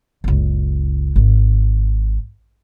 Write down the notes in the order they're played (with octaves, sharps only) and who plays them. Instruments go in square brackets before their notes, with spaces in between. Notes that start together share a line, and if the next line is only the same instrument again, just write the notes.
[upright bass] F#1 C#2
G#1